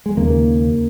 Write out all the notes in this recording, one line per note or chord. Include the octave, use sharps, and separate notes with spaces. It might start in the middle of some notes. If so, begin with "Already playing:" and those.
G#3
D#2 C#3 A#3